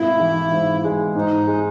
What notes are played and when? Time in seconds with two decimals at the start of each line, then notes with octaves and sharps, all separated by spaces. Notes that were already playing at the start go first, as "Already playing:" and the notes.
Already playing: G#1 B2 A3 E4
0.20 E3
0.52 G#2
0.84 G#3
1.15 G#2 D#4
1.47 G#3